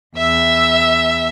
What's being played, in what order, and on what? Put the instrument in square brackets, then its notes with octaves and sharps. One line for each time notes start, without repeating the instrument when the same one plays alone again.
[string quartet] E2 E5 E6